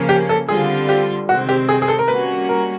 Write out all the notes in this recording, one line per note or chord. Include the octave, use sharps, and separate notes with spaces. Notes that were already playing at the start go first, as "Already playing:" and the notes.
Already playing: C#3 F3 A#3 C#4
G4
A4
D3 G3 C4 F4 G#4
G4
C3 D#3 G#3 C4 F#4
G4
G#4
G#4
A4
A#4
G3 A#3 C#4 F#4 B4
A#4